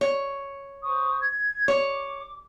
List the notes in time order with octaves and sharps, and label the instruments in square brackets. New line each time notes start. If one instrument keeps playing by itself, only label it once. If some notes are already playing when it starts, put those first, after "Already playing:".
[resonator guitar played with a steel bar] C#5
[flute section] C5 C#6 D#6
G#6
[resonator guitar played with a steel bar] C#5 [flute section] D6